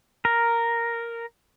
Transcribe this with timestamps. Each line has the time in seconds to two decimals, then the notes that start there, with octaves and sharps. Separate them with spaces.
0.25 A#4